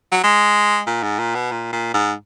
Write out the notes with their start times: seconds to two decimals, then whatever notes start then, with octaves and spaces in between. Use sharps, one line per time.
0.12 F#3
0.24 G#3
0.87 A#2
1.03 G#2
1.19 A#2
1.35 B2
1.52 A#2
1.73 A#2
1.94 G#2